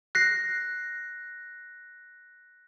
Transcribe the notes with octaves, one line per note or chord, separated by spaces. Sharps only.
F#6 A#6 C7